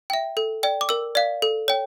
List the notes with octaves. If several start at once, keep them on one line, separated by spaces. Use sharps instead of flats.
E5 G5
A4
D5 G5
D6
A#4 E6
D5 F5
A4
C#5 G5